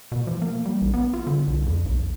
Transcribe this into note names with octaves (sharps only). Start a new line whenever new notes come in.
B2
F3
A#3
G3
A#1
B3
F4
D3
C2
F2
B1